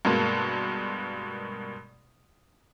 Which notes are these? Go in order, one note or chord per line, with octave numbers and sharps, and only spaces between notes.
G2 B2 G#3 A#3